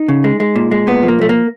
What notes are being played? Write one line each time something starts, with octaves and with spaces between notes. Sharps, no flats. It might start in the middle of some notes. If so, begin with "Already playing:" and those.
Already playing: D#4
C#3
G#3
G#3
A#2
G#3
A#2 B3
F3
A#3
B1 A3
A#3